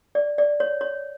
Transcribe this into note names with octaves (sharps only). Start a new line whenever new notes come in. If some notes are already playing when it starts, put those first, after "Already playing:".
D5
D5
C#5
C#5